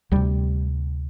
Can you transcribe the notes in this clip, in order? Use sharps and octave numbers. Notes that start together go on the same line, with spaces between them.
D2 C3 G3